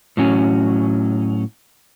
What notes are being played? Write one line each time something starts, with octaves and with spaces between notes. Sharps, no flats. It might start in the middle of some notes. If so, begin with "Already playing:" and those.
A2 F#3 C#4